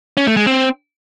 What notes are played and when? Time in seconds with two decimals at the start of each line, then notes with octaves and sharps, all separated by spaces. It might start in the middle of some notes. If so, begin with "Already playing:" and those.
0.17 C#4
0.27 A3
0.37 G#3
0.46 C4